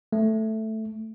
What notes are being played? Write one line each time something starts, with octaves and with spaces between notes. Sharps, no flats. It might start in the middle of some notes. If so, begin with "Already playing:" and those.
A3